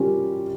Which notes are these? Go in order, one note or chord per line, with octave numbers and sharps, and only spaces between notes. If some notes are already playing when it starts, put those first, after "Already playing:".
Already playing: G3 C#4 F4 A#4